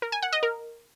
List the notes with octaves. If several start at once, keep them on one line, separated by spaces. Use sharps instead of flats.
A#4
G#5
F#5
D#5
A#4